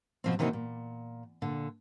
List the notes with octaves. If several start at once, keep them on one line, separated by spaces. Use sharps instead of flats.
B2 F3 C4
C3 D#3 E3 A#3 D#4 F#4
A#2
A#2 D3